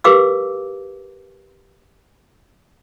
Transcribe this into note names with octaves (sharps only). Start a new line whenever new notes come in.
G4 A#4 B4 F5 D6 E6